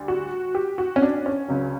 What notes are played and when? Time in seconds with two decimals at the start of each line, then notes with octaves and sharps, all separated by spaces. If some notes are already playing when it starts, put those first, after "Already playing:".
Already playing: D2 D3 G3
0.08 F#4
0.55 G4
0.78 F#4
0.96 C#4
1.02 D4
1.26 C#4
1.48 C#2 C#3 F#3